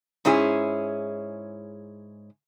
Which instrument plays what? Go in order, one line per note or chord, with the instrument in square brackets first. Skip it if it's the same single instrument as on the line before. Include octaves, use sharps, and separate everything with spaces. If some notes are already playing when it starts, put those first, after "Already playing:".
[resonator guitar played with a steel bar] G#2 C#4 E4 G#4